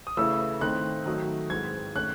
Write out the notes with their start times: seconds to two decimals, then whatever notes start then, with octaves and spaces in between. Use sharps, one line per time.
0.07 D#6
0.17 C#3 E3 A3 C#4 E4 E6
0.61 D#3 A3 C4 D#4 F#6
1.05 D#3 F#3 A3 D#4
1.50 G#2 E3 G#3 C4 G#6
1.95 D#3 A3 C#4 F#6